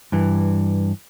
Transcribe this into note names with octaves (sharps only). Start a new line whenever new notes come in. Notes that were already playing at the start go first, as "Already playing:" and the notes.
G2 E3